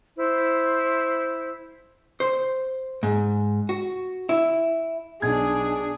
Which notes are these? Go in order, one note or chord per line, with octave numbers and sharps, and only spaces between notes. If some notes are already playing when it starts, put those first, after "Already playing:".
E4 C5
C5
G#2
F#4
E4
B1 D4 G#4 G#6